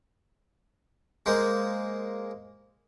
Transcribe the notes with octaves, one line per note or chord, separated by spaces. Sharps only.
G#3 A#3 C5